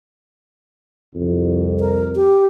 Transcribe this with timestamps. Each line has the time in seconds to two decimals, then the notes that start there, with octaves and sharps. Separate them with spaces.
1.14 C2 F2
1.80 A#4
2.15 G4